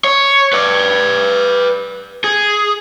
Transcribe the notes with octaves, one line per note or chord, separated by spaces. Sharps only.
C#5
B4 D5
G#4